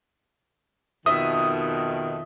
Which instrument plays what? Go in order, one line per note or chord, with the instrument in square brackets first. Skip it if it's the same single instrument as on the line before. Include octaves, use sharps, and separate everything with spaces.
[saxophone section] F2 B2 D#3 [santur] E5 [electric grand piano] D#6